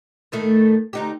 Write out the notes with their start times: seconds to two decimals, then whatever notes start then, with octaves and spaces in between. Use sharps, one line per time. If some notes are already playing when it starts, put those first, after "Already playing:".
0.32 A2 D#3 A3
0.93 D2 D#4 G4